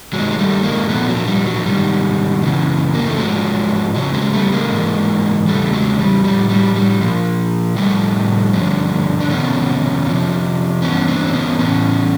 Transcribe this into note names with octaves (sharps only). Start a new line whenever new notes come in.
G2 D#3 F#3 G#3
G#3
G3 A3
G#3 A#3
A#2 F3 A3 B3
F#3
G3
F#3
G#2 D#3 G3
F#2 C#3 E3
A#3
A3
G#2 F3 F#3 G#3
F2 C#3 F3 F#3
F#3 G#3
G3 A3
B3
G#3 A#3
G#2 E3
E2 C#3 E3 G3 A3
F#3 G#3
G3
A2 F3 G3
G3
G3
A#2 F3
A2 F3 G3 A3
G2 D3 F3
D4
F2 C3 D#3 B3 C#4
F2 C3 F3
G2 E3 B3 C#4
C4 D4
C4
B3 C#4
A2 E3 B3 C#4